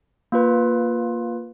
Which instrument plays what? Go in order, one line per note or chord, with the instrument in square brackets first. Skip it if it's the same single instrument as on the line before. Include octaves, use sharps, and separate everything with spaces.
[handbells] A#3 F4 B4